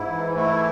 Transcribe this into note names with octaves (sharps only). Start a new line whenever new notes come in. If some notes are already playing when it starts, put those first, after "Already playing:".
Already playing: G#2 E4
E3
A3 E4